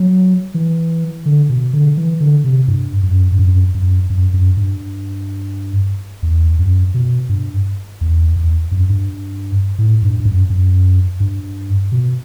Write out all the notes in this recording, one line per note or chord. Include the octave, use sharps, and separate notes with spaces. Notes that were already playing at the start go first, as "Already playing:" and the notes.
Already playing: F#3
E3
D3
B2
D3
E3
D3
C3
G2
F#2
G2
F#2
F#2
F#2
F#2
G2
E2
F#2
B2
G2
E2
E2
F#2
G2
A2
G2
G2
F#2
F#2
G2
B2